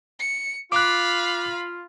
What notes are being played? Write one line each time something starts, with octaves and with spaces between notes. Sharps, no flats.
C#7
F4 F5 B5 D6 F#6